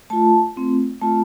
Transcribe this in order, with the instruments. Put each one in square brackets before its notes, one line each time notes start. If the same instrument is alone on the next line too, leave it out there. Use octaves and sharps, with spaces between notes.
[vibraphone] A3 F4 A5
A3 C4 F4
A3 C4 F4 A5